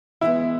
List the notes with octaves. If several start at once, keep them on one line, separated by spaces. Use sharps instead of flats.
E3 G#3 B3 E4